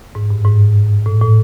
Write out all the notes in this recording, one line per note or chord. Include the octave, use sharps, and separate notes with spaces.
G#2
G2
G#2
A2
A2